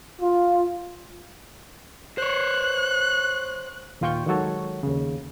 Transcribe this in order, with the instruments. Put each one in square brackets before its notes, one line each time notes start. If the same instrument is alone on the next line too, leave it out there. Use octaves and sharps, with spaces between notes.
[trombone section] F4
[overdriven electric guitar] C5 C#5 [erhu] F#6
[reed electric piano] D#2 A#2 F4 G5 C#6 G6
D#3 F#3 G#3 F#4 A4 C#5
D#2 C#3